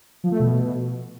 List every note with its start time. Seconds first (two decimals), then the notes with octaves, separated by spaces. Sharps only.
0.24 F3
0.32 A3
0.40 B2